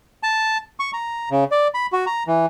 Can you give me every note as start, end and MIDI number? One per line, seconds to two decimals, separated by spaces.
0.23 0.58 81
0.80 0.91 85
0.93 1.29 82
1.31 1.44 49
1.51 1.68 74
1.74 1.86 83
1.92 2.05 66
2.07 2.23 82
2.27 2.46 52